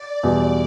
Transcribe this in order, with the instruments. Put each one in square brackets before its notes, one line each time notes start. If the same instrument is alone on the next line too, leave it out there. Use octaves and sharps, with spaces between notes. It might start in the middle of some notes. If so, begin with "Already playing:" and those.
Already playing: [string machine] D5
[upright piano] E2 B2 G3